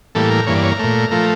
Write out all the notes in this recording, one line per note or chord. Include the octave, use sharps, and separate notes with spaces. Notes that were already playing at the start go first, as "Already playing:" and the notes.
A2 E3 G3 A#3 A4
A#4
G2 E3 A#3 C#5
D5
C#5
A#4
A#2 A3
F3 A3 A#4